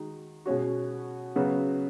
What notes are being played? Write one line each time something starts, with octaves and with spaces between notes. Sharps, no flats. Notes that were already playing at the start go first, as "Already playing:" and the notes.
Already playing: D#3 G#3 D#4 F#4
B2 G#3 C#4 F#4
C#3 F#3 B3 F#4